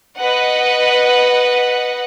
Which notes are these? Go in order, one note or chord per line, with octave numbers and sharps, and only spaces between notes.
B4 D#5 F#5